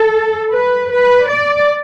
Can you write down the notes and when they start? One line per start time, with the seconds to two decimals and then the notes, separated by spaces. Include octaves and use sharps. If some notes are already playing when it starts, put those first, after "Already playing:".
Already playing: A4
0.52 B4
0.91 B4
1.28 D5